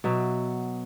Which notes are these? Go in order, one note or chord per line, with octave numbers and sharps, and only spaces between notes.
B2 F#3 E5